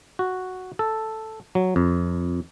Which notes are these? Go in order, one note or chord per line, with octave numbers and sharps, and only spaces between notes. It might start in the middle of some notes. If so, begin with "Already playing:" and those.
F#4
A4
F#3
F2